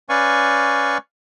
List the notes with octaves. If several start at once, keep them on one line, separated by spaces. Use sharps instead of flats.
C#4 B4 D5 F5 G#5 C#6